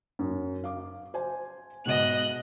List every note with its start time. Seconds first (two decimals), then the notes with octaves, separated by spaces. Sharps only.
0.19 F#2
0.64 F5 D6
1.14 C5 G#5
1.86 G#2 B2 D#5 F#6